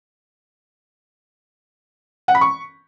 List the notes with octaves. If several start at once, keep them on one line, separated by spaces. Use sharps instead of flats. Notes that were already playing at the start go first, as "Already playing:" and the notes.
F#5
B5
C#6